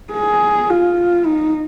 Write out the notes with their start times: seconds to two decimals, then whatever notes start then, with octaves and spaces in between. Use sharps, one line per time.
0.12 G#4
0.70 F4
1.26 D#4